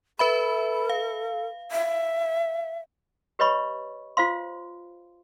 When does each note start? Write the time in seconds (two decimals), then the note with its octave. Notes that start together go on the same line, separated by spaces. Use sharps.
0.19 A4 B4 E5 B5
0.89 F5
1.71 E5
3.39 G4 B4 C#5 D#5 B5 C#6
4.17 F4 C5 F5 C6